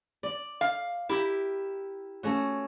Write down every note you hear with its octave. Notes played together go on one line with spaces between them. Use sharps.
D5
F5
E4 G4 A#4
A3 C#4 F#4